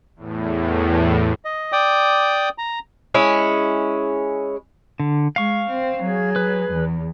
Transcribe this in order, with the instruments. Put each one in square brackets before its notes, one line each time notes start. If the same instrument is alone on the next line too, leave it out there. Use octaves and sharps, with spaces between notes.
[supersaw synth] E2 A2
[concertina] D#5
D5 G5 D6 D#6
A#5
[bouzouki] G#3 C#4 E4
[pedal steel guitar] D3
[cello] G#3 [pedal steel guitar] F5 C#6
[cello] C4
F#3 G#4
[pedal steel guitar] B4
[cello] E2